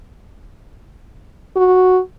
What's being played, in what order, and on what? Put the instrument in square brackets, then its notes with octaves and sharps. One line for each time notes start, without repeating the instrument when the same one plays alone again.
[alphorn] F#4